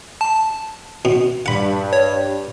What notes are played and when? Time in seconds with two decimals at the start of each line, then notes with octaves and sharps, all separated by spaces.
0.21 A5
1.05 B2
1.46 G2 F#5 B5
1.93 C#5